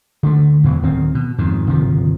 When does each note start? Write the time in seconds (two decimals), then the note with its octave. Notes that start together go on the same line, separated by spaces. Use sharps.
0.23 D3 A3
0.64 E2 B2 E3
0.82 D1 D#3 C4
1.15 B2
1.38 F2 G#2 D#3
1.67 G1 C3 D#3 F3